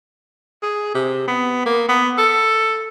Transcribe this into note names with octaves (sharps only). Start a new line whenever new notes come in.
G#4
C3
B3
A#3
B3
A4